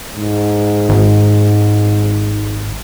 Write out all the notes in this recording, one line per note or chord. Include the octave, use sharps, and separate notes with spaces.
G#2
G#1